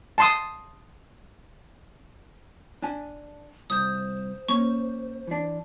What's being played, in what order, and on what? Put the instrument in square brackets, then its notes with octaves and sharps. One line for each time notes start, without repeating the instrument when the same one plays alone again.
[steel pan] A5 C6 D#6
[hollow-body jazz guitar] D4 G#5
[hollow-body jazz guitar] C2 [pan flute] C5 [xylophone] D#6 G6
[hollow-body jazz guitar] A#3 C#4 [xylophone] C#6
[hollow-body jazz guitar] E3 D4